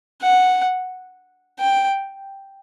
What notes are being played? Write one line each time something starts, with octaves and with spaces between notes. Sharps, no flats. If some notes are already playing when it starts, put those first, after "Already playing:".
F#5
G5